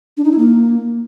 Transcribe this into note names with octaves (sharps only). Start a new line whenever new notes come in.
D4
D#4
E4
A#3